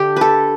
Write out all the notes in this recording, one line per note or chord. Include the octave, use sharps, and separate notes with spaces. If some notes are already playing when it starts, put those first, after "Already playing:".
Already playing: D3 G4
A4 B4